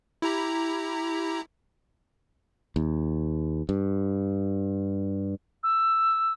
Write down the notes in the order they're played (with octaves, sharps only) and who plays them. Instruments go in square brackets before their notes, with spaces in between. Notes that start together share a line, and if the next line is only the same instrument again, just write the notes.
[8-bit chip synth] E4 G4 A#5
[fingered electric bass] D#2
G2
[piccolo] E6